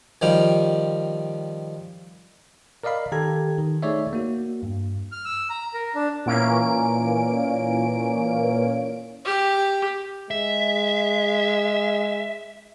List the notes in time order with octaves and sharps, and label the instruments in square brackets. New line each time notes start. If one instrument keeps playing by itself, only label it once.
[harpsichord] D#3 F3 G3 F5 G5
[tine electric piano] A#4 D5 D#5 F5 B5
D#3 G4 A4 A#5 G#6
D#3
A3 D#4 G#4 C#5 D5 E5
A#3 F#4
G2
[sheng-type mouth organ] F6
E6
A#5
A#4
D4
[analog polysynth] A#2 E3 A#3 C#4 D7
[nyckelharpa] G4
[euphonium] G#3 [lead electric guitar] E5